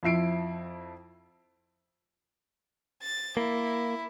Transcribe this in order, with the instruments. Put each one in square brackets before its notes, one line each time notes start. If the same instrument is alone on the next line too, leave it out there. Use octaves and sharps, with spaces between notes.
[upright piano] F2 F3 E4 C7 D7
[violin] A6
[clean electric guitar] A#3 [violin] E4